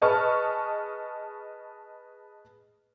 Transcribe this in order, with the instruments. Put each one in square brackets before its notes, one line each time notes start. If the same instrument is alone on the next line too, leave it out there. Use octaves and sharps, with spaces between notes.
[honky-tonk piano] G#4 B4 D#5 A5 C#6 F6